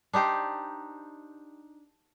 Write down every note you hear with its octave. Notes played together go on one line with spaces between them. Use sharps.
D4 D#4 G4 C5